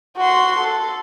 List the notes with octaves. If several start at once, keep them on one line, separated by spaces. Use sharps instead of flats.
F#4 C6
A4